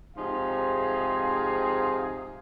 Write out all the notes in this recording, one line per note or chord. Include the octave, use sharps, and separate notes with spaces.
G#2 C3 F3 D#4 G#4 F5